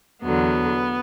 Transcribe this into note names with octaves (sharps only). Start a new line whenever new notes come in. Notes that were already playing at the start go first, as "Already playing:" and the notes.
E2 D3 F#3 B3